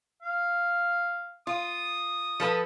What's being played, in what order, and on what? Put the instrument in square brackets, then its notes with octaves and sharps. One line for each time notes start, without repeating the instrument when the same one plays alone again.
[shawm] F5
[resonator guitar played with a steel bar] F4 [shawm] D#6
[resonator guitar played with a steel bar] F3 A4 B4